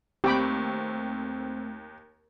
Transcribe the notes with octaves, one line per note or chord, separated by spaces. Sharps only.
D#2 A3 C4 G4 G5 B5